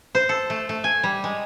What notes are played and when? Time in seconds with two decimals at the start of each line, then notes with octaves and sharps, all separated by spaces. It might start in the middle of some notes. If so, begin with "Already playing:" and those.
0.15 C5
0.29 A4
0.50 A3
0.69 A3
0.84 G#5
1.03 G3
1.24 G#3